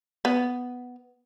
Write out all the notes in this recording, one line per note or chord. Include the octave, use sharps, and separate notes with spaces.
B3